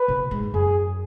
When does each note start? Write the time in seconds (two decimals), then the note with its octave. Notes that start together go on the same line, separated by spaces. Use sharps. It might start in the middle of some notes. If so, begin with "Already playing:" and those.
Already playing: B4
0.08 B2
0.31 G#2
0.54 F#2 G#4